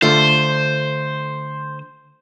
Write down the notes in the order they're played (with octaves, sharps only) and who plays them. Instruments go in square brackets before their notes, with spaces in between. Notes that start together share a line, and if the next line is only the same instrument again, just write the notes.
[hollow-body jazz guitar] D3 A3 F4 [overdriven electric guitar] C5